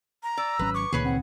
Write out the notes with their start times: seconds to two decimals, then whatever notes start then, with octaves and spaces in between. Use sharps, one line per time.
0.23 A#5
0.37 D5 E6
0.59 G#1 F#3 C#4 B4
0.75 C#6 D6
0.93 C#2 A#2 D#3 A#3 G#4 B4 C#5
1.05 C4 F#5